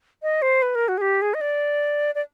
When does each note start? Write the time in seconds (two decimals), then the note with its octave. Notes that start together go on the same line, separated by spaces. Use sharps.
0.23 D#5
0.42 C5
0.62 B4
0.75 A#4
0.88 F#4
0.98 G#4
1.01 G4
1.22 G#4
1.34 D#5
1.41 D5
2.15 D5